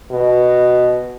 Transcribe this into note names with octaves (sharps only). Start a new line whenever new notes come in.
B2